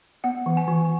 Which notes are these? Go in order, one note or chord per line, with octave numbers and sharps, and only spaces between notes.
B3 F#5
E3
G#5
E3